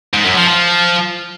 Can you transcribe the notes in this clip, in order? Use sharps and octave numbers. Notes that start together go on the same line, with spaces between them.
G#2
F#2
F3
F3